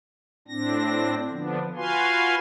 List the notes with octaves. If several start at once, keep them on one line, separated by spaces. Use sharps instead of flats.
A2 C4 D4 A#6
D3 F3 B3 D4
F4 F#4 B4 F5 G#5 C6